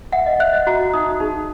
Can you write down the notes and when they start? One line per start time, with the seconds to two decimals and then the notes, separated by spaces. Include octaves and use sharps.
0.12 E5 F#5
0.26 D#5
0.40 E5 F#6
0.53 D#5
0.67 F#4 A#5
0.93 D#4 D#6
1.20 D#4 G#4